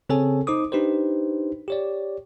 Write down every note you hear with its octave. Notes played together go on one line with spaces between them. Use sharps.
C#3 C4 G#4 A4 C#5 G#5
D#4 C5 D6 D#6
D4 D#4 G4 B4 C5
G4 C#5 D5